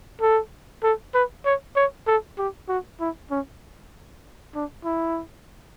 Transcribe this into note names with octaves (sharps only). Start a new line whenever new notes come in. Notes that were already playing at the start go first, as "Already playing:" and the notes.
A4
A4
B4
C#5
C#5
A4
G4
F#4
E4
C#4
D4
E4